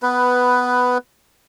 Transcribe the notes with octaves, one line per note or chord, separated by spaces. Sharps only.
B3 B4